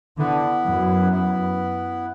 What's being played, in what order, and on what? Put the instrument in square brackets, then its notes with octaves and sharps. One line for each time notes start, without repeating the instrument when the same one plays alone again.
[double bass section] D3 [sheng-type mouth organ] B3 E4 B4
[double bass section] F#2
[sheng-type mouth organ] B3 E4 B4